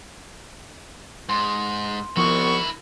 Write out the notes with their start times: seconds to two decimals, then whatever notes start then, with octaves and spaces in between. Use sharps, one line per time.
1.29 G#2 C6
2.17 C2 D#3 F3 B3 E4 C#6